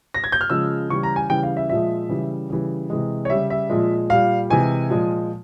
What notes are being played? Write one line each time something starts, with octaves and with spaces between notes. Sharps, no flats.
A#6
G#6
G6
F6
C#3 F3 G#3 E6
C#3 E3 G3 C#6
A#5
G#5
C#3 E3 G3 G5
F5
E5
A#2 F3 G#3 E5
C#3 E3 G3
C#3 E3 G3
C3 E3 G#3
C#5
C#3 G3 E5
E5
A#2 F3 G#3
A#2 G3 F5
C3 E3 G#3 G#5
A#2 F3 G#3